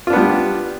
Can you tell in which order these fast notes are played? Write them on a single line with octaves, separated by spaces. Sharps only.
F4 D4 B3 G3